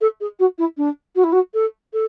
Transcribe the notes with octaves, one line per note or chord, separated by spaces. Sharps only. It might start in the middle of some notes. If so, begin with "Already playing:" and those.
A4
G#4
F#4
E4
D4
F#4
E4
F#4
A4
A4